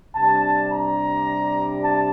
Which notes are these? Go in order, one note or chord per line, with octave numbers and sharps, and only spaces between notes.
C3 G3 D4 A5
A#5
A5